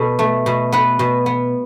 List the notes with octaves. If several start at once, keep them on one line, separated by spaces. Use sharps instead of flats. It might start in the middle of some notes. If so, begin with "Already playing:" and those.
Already playing: B2 A4
A3
B2
B3 B4
B2
B3